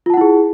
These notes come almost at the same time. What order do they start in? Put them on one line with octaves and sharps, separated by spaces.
F4 A5 F#5 E4 G#4